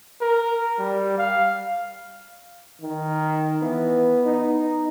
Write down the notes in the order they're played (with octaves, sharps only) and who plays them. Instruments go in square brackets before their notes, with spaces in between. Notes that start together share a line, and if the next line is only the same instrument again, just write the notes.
[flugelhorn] A#4
G3
F5
[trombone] D#3
[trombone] E3 [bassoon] B3
[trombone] D#4